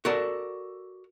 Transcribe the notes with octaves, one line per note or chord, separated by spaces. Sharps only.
F#4 A4 A#4 D5